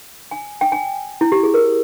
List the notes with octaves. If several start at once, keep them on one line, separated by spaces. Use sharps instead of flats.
G#5
G5
G#5
E4
G4
G#4
A#4